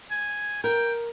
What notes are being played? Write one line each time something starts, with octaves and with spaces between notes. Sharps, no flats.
G#5
A#4 G5